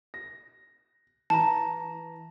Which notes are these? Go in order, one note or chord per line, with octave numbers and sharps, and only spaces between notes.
A#6
E3 A5 A#5